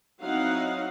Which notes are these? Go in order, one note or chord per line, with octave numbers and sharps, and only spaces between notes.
F#3 C4 D#4 E4 F5 F#5